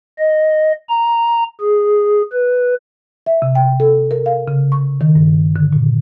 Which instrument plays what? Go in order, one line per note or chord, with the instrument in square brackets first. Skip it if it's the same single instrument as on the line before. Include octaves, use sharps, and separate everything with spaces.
[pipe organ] D#5
A#5
G#4
B4
[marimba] E5
C3
G5
A4
A#4
F5
C#3
C#6
D#3
G2
D3
A#2